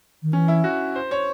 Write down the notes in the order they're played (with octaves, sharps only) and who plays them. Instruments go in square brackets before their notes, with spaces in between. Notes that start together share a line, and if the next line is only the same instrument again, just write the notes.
[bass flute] D#3
[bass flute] E3 [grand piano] C#4
[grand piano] E4
F#4
C5
C#5